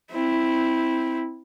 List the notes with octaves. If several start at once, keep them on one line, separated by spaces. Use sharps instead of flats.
C4 E4